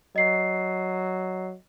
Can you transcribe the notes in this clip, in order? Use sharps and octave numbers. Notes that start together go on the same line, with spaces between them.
F#3 D#5 C7